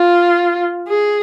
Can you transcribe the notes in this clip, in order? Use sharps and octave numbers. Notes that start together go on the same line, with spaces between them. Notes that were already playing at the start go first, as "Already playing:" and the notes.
Already playing: F4
G#4